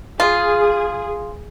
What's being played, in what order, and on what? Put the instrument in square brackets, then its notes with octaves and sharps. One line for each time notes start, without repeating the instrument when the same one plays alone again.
[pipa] F4 [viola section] G#4